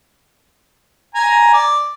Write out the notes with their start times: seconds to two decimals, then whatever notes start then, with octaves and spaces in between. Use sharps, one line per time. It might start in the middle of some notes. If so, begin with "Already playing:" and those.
1.15 G#5 A#5
1.53 D5